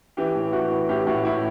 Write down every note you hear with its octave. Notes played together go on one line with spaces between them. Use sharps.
E3 G4
A2
E3 F#4
E3
A2 G4
A2 F#4
A2 E4